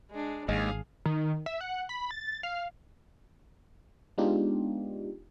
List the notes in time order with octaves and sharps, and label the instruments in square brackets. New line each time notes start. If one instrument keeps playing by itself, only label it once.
[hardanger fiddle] G#3 D4
[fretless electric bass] G#1 [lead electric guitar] D#2 [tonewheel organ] G#3 [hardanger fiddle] G#4 F5
[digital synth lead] D#3
E5
F#5
B5
A6
F5
[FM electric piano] G#3 B3 D4 D#4 F4 G4